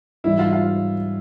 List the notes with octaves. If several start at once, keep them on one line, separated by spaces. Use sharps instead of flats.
G#2 E3 G3 E4
F4
F4